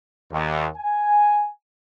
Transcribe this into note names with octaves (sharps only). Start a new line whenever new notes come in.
D#2
G#5